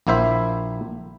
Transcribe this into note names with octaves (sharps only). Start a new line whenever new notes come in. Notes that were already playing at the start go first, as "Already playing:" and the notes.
A#1 A#3 E4 C5 E5